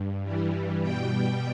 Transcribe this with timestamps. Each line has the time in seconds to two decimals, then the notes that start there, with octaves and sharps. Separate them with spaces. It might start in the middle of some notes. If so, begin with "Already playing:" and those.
Already playing: G2
0.23 G2 E3 G3
0.82 B2 G3 G5